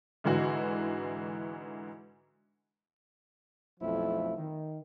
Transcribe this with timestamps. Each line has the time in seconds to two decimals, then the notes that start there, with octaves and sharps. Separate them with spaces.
0.24 G#2 D3 E3 F#4
3.80 B1 F2 F3 A3 E4
4.37 D#3